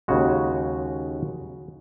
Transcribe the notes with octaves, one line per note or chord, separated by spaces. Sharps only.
D#2 C#3 G#3 F#4